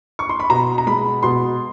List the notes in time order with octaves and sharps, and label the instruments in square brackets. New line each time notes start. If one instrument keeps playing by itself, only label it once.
[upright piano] C#6
C6
B5
B2 A#5
A#5
G#3 B5
B2 C6